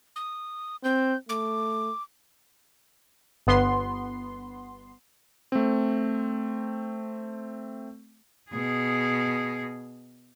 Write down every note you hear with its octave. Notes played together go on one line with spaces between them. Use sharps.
D#6
C4 G6
A3 D6
G1 B3 C6
A3 C4
B2 G#4